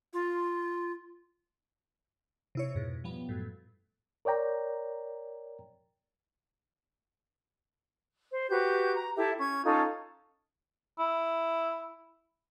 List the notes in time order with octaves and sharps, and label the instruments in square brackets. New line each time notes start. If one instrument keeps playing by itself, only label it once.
[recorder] F4
[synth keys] C3 E4 C#5
F2 G#2 B2
F3 G3 B3
F#2 A2
[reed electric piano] A#4 C#5 D5 G5 A#5
[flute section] C5
F#4 G4 B4 G6
A#5
E4 G4 A4 E5
C#4 G#6
C#4 D#4 F4 A4
[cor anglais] E4